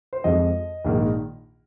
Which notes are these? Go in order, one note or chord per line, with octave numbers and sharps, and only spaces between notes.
C5
F2 F3 G#3 D#5
A#1 G#2 D#3 A#3